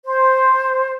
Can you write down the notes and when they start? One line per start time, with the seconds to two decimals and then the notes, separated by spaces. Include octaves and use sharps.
0.04 C5